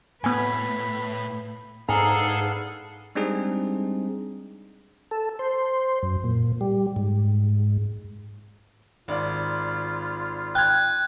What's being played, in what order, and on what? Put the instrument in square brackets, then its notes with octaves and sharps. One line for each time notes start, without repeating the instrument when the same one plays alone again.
[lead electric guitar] A2 [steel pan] B3 G#5 [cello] B4
[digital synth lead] G#2 [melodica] B3 D4 F5 [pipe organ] G#4 A4 [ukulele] G#5 A#5
[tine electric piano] G3 G#3 C4 D4 D#4 G#4
[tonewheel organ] A4
C5
F#2
A#2
G3
G#2
[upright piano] G#1 D5 [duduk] F4
[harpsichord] G5 [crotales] F#6 G#6